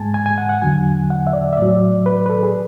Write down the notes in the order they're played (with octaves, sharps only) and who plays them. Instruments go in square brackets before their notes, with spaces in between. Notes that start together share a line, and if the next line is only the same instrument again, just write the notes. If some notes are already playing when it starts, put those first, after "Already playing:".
Already playing: [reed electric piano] G#2 G#3 G#5 A5
G#5
G#5
F#5
F#5
E2 D3 F#3 G#5
F#5
E5
D5
E5
A2 F#3 D5
B4
B4
A4
G#4